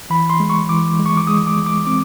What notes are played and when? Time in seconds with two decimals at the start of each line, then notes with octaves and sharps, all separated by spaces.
0.10 E3 B5
0.30 C6
0.40 G#3
0.50 C#6
0.69 E3 D6
0.99 G#3
1.06 C#6
1.17 D6
1.27 G#3 D#6
1.47 D6
1.57 G#3
1.66 D6
1.86 C4 D6